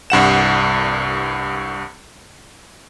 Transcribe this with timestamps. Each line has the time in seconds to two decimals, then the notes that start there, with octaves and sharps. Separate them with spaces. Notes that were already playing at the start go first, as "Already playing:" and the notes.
0.10 C2 G2 F#5 E7